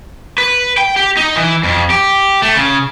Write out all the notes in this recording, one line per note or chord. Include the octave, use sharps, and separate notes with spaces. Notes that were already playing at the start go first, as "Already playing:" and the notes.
B4
G5
G4
D#4
E3
F2
G4
A3
C#3